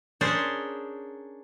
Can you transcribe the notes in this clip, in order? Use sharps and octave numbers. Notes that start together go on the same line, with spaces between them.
C#4 D4 G#4 A#4 C5 D5